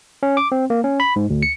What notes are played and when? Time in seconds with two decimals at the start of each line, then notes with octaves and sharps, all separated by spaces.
0.23 C#4
0.37 D6
0.52 C4
0.70 A#3
0.84 C#4
1.00 B5
1.16 G#2
1.30 D2
1.43 C#7